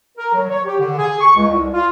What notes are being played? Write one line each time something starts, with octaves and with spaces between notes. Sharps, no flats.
A#4
F#3
C#5
G4
D3
G#4
C#6
C#2
C2
F4